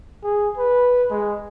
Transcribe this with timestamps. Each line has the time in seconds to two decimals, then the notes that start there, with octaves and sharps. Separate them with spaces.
0.23 G#4
0.58 B4
1.10 G#3